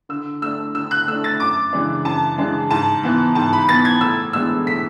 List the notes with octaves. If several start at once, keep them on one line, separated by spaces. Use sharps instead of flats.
D3 E6
A3 D4 E6
D3 E6
F#6
A3 D4 E6
A6
F#2 D6
C#3 E3 G#3 D4
F#2 A5
C#3 E3 G#3 D4
G#2 A5
E3 B3
G#2 A5
B5
E3 B3 A6
G#6
A2 E6
E3 G#3 B3 D4 E6
A2 B6